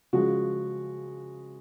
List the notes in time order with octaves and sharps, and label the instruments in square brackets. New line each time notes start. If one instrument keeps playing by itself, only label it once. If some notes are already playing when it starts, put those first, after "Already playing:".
[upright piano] C#3 F3 G#3 F#4